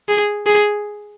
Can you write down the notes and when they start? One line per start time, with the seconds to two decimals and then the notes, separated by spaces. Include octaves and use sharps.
0.09 G#4
0.47 G#4